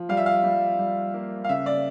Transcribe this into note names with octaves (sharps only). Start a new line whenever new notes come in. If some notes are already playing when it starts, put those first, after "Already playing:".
Already playing: F3
G3 F5
E5
F5
G3
G3
A#3
F5
C#3 E5
D5